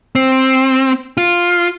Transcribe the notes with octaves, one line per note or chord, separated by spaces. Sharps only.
C4
F4